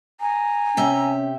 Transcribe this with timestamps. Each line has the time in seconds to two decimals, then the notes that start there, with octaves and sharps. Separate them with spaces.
0.21 G#5 A#5
0.77 C3 C#4 G4 E5